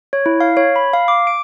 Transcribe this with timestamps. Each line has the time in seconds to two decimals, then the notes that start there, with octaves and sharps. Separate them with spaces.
0.13 C#5
0.26 E4
0.41 F5
0.57 C#5
0.76 B5
0.94 F5
1.08 D6
1.27 D7